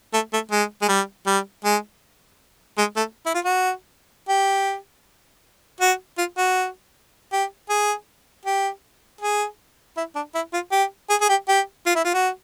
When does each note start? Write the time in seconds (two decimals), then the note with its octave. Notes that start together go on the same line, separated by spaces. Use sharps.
0.14 A3
0.33 A3
0.51 G#3
0.82 G#3
0.89 G3
1.27 G3
1.65 G#3
2.78 G#3
2.97 A3
3.26 E4
3.34 F4
3.45 F#4
4.29 G4
5.81 F#4
6.18 F4
6.38 F#4
7.32 G4
7.69 G#4
8.45 G4
9.21 G#4
9.97 E4
10.15 D4
10.35 E4
10.53 F4
10.72 G4
11.10 G#4
11.21 G#4
11.29 G4
11.49 G4
11.86 F4
11.96 E4
12.05 F4
12.14 F#4